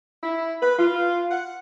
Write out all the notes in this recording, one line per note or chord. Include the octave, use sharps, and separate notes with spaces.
E4
B4
F4
F#5